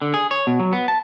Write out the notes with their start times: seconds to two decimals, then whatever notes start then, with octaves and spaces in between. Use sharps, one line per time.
0.02 D3
0.14 G#4
0.31 C#5
0.47 B2
0.60 F#3
0.73 B3
0.88 A5